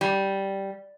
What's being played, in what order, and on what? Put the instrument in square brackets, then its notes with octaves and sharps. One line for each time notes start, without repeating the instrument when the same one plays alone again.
[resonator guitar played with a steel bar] G3